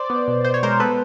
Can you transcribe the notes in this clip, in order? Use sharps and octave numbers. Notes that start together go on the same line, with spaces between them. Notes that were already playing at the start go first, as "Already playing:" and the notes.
Already playing: C5 D5
B3
B2
B2 C5
C#5
G#3 A#4 C5
B3 A4 B4